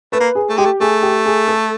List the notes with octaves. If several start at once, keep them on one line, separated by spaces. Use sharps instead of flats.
A3 B4
A#3
G#4
A3
G#3 G4
A3
A3 G#4
G4
G#4
A4